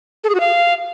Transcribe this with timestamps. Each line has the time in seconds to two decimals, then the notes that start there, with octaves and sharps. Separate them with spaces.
0.24 A4
0.29 G#4
0.35 F#4
0.40 F5